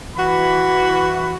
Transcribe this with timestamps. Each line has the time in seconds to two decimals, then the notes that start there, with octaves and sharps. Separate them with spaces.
0.16 E3 F#4 B5